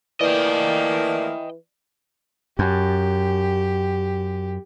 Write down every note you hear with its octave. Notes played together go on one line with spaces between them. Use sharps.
E3 F3 A3 A#3 D5 D#5 G5
F#2 G4